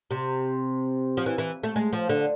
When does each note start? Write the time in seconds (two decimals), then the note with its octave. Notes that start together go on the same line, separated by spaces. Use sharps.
0.11 C3
1.17 F3
1.26 E3
1.38 E3
1.63 A3
1.76 G#3
1.93 F3
2.09 D3